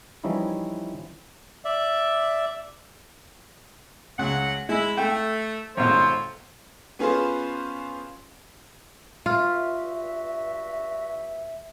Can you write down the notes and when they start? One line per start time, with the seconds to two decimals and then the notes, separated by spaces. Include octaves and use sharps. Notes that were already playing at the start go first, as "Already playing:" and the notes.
0.24 E3 F3 G3 C#4 D#4 E4
1.65 D5 E5
4.19 C#2 F#3 F#5
4.69 G#3 E4
4.97 A3 G5
5.77 G#1 B2 F4 A4 C5 C#5
6.99 B3 C#4 F4 G#4 B4 C5
9.26 G2 F4 F#4 E5